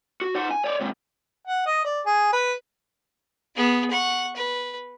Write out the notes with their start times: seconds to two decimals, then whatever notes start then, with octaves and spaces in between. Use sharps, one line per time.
0.21 F#4
0.36 D#4 F#5
0.51 G#5
0.64 C#5 D5
0.81 G#2 C3
1.48 F#5
1.66 D#5
1.85 D5
2.06 G#4
2.33 B4
3.56 B3 G#4
3.90 F#5 C#6
4.36 B4